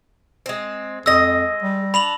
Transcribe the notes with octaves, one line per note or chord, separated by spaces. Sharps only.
G#3 C4
F2 G#3 D#5 E6 A#6
G3
D4 B5 F7 F#7